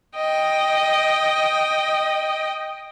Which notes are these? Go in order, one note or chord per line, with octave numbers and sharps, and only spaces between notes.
D#5 G5